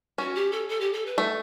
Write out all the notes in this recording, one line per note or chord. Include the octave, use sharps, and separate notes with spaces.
C#4 F#4
G4
A4
A4
G4
A4
B4
A3